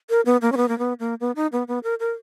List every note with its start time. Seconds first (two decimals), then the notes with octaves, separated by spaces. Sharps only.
0.10 A#4
0.26 B3
0.42 A#3
0.52 C#4
0.57 B3
0.68 A#3
0.78 B3
1.00 A#3
1.20 B3
1.36 D#4
1.52 B3
1.68 B3
1.83 A#4
2.00 A#4